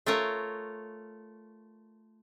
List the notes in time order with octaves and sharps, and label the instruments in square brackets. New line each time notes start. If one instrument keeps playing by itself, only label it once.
[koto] A3 F4 A#4 C#5